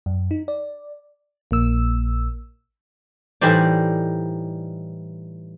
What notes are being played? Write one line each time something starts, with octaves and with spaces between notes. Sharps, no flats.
F#2
D#4
D5
A#1 A#3 E6
A2 E3 G3 D#4 C5 D5